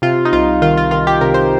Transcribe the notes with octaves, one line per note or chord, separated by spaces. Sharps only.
C3 F4
D#4
C2 F4
D#3 F4
F4
D#3 F4
G4
C3 A#4
C5